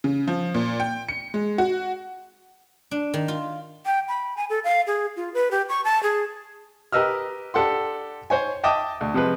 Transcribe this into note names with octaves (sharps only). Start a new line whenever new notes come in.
C#3
F3
A#2
G5
C#7
G#3
F#4
D4
D#3
F4
G5
B5
G#5
A4
F5
G#4
F4
B4
G4
C#6
A5
G#4
G4 A#4 B4 D#5 E6 F6
D4 G4 A4 F#5 C6
C5 C#5 G#5
D#5 E5 G5 A5 D6 D#6
D2
C3 F3 G#3 B4